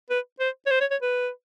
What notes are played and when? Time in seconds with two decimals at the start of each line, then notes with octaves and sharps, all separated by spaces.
0.10 B4
0.40 C5
0.66 C#5
0.71 C5
0.81 C#5
0.91 C#5
1.02 B4